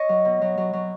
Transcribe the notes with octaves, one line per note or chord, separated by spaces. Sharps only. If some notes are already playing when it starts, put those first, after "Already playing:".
Already playing: C#5 D#5
F#3
B2
F#3
F#3
F#3